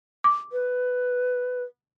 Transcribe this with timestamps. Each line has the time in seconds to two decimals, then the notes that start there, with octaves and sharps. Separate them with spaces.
0.24 D6
0.52 B4